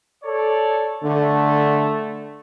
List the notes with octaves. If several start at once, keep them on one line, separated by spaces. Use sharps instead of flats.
A4 C#5 D5
D3 A3